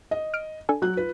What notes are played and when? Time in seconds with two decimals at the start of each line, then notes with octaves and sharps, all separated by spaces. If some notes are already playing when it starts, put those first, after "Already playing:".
0.11 D#5
0.34 F6 D7
0.69 D4 A4 G#5
0.82 F#3 F#6
0.97 F4 B4